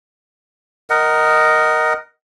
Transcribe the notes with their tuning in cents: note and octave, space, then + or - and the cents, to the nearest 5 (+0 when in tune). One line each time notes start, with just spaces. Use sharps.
A#4 +0 D#5 +0 F#5 +25